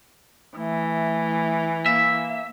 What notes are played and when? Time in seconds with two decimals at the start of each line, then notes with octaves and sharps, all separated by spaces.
0.57 E3 A3
1.86 A#3 E5